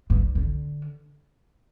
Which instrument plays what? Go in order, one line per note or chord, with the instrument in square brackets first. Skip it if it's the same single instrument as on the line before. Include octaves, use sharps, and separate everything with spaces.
[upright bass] G2
D3